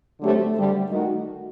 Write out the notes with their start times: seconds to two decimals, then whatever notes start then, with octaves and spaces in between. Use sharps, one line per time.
0.21 D3 F#3 A3 C4 G4
0.57 G2 D3 G3
0.91 D#3 A3 D#4 F#4